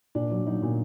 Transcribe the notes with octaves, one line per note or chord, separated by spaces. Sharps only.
A#2 D4
F#3
F#3 D#4
A#2